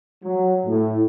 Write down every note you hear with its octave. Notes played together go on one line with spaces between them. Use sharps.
F#3
A2